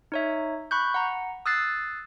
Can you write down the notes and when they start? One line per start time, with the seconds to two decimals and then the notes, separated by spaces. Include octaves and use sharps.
0.12 D#4 C#5 E5
0.71 B5 C#6 F#6 G6
0.94 F#5 A#5
1.46 D#6 E6 F#6 A6 C7